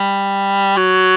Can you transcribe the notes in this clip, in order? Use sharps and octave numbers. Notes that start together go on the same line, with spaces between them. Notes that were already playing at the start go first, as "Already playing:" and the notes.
Already playing: G3
F#3